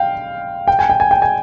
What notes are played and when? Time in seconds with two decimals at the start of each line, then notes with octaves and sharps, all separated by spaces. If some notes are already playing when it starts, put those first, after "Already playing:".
Already playing: F5 G5
0.68 G5
0.79 G#5
0.90 G5
1.00 G#5
1.11 G5
1.22 G#5